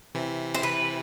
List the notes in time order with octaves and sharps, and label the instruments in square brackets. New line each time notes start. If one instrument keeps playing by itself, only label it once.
[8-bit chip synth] C3 E3
[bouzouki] C5
B4